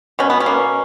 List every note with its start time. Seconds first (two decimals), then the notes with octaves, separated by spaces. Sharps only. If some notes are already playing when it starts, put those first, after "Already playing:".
0.19 B2 C#4
0.30 B3
0.40 C#4
0.46 A#3